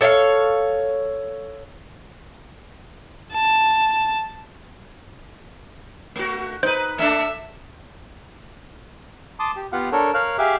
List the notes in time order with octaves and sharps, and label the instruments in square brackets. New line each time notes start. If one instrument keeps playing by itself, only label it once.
[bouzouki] A4 C#5 E5 F5
[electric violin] A5
[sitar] A3 F#4
[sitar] D#4 B4 [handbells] C5 G6
[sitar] A3 D4 [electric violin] E5
[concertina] A5 C6 D6 D#6
G4
B3 F4 G4 F5 F#5
D4 A4 A#4 C#5
A#4 C#5 F5 F6 F#6
G4 G#4 E5 F5 D6